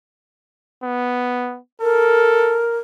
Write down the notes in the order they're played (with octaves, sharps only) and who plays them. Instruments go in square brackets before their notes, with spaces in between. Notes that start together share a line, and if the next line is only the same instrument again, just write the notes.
[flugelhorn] B3
[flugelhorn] A4 [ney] A#4